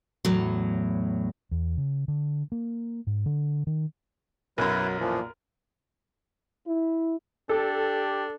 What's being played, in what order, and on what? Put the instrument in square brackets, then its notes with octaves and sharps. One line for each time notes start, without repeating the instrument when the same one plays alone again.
[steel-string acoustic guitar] E2 A2 F#3
[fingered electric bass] E2
C#3
D3
A#3
G#2
D3
D#3
[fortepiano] B1 F#2 [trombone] F#3 [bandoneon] E4 B4 [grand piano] A#4
[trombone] A#2 [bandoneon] E3 F3
[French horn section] E4
[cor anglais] D4 [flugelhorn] G4 [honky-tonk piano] A4